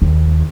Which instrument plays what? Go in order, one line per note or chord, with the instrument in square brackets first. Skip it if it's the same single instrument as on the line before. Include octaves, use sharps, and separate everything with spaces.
[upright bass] D#2